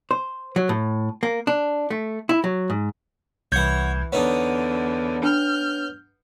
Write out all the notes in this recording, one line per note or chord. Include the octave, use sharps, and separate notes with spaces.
C5
F#3
A2
A#3
D4
A3
E4
F#3
G#2
C2 E3 C#5 F#5 G6 G#6
E2 D3 B3 D#4 C#5
D4 F6 G6